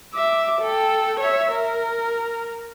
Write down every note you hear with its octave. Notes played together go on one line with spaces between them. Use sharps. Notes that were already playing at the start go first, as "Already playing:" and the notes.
E5 D6
A4 G5
C#5 E5
A#4